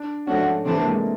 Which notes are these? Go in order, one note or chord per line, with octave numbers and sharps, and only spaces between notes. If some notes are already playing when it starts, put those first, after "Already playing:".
Already playing: D4
G#2 F3 A3 C#4 D4 F#4
C3 E3 A3 C4 D4
A#3
G#3
A3